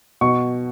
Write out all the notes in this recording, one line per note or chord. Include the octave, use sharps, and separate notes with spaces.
B2 C#6